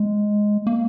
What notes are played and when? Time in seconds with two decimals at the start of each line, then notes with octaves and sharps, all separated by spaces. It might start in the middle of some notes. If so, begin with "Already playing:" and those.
Already playing: G#3
0.67 A#3